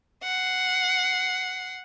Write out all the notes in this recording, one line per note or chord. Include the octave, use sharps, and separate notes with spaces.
F#5 C7